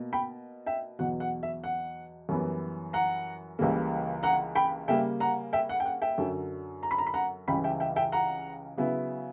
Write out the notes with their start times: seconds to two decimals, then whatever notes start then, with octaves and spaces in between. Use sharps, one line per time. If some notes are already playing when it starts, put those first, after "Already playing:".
Already playing: B2 A#3
0.13 G5 B5
0.66 E5 G5
0.99 E2 B2 F#3 F#5
1.20 F#5
1.43 E5
1.64 F#5
2.29 F#2 E3 G3 B3
2.93 F#5 A#5
3.59 C#2 C#3 E3 G3 A#3
4.23 F#5 A#5
4.55 G5 B5
4.88 C#3 G3 A#3 E5 G5
5.20 F#5 A#5
5.53 E5 G5
5.69 F#5
5.80 G5
5.86 F#5
6.02 E5 G5
6.18 F#2 D3 F#3
6.83 A#5
6.91 B5
6.98 A#5
7.07 B5
7.14 F#5 A#5
7.48 C#2 C#3 E3 G3 C#4 G5 B5
7.64 E5 G5
7.80 E5 G5
7.96 E5 G5
8.12 F#5 A#5
8.77 C#3 F#3 B3 E4